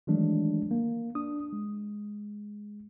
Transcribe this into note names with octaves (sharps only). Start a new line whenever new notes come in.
D#3 E3 F#3 G#3 A3 D4
A#3
D4 D#6
G#3